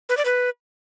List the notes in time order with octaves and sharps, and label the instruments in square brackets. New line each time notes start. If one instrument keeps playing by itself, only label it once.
[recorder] B4
D5
B4